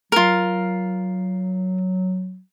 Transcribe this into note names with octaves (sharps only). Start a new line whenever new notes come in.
F#3 F4 A#4